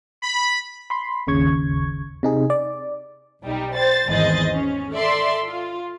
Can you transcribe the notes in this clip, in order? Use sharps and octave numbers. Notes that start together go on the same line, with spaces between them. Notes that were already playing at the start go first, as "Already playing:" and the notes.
B5
B5 C6
G1 D#2 C#3 C#6 G#6
C3 D#4 G#4
D5
B1 G3 D#4
C5 A6
G#1 E2 G#4 C5 D#5 A6
C#4
A4 D5 E5 C6
F4